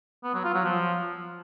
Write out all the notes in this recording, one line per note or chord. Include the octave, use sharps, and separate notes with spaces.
B3
F#3
F4
F#3
F3